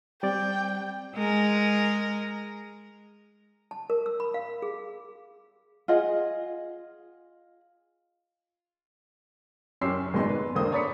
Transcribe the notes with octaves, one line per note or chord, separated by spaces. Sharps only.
G3 C4 D5 G5
G#3 A#4
A5
A#4
E6
B5
F5
G#4
F4 G#4 D#5 F#5
F#2 C#4 G4 C6 E6 C7
G#1 G#2 B2 G#3 B3 C6
B4
E1 D3 A#3 C5 D#6
C#5 D5 A#5 B5 B6 C#7